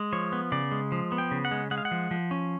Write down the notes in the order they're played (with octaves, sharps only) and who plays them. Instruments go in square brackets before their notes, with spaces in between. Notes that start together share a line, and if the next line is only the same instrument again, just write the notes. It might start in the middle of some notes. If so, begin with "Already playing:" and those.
Already playing: [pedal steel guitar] G#3
F3 C#5
B3
C#3 D5
G#3
F3
B3
G5
C#3
F#5
G#3
G#3 F#5
F5
F#5
F3
F3
C#4